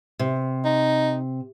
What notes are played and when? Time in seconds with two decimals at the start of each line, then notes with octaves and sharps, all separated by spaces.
0.19 C3
0.65 D#4